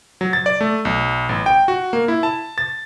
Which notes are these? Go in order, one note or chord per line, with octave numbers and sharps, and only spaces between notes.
F#3
A6
D5
A3
B1
A1
G5
F#4
A#3
E4
A5
A6